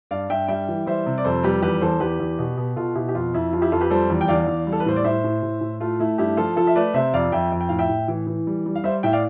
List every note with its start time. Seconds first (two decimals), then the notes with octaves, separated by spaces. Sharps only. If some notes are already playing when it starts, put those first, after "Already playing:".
0.11 G2 D5 F5
0.29 G2 E5 G5
0.48 G3 E5 G5
0.68 E3
0.86 G3 C5 E5
1.06 C3
1.18 D5
1.25 F2 A4 C5
1.43 G3 G4 B4
1.62 E2 G4 B4
1.81 E2 A4 C5
2.00 E2 G4 B4
2.20 E2
2.39 B2
2.57 B2
2.76 B2 F4 A4
2.95 B2 E4 G4
3.09 G4
3.14 F2 F4
3.34 F2 E4
3.53 F3 F4
3.62 E4 G4
3.72 F2 F4 A4
3.81 G4 B4
3.90 G3 A4 C5
4.10 E2
4.21 G5
4.28 E2 D5 F5
4.47 E2
4.67 G3
4.73 A4
4.80 B4
4.86 A2 C5
4.96 D5
5.04 A2 C5 E5
5.24 A2
5.43 A2
5.61 A2
5.80 A3 F4
5.99 A3 E4
6.18 G2 E4 G4
6.37 F3 F4 A4
6.56 F3 F4 A4
6.67 E5
6.75 A3 B4 D5
6.94 C3 C5 E5
7.14 F2 D5 F5
7.32 F2 E5 G5
7.52 F2
7.61 G5
7.69 A2 F5
7.79 E5 G5
7.89 A2
8.08 E3
8.27 E3
8.47 G3
8.66 G3
8.75 F5
8.84 G3 C5 E5
9.03 A2 E5 G5
9.13 D5 F5